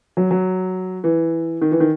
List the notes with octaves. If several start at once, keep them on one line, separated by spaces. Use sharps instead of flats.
F#3
F#3
E3
D#3
E3
D#3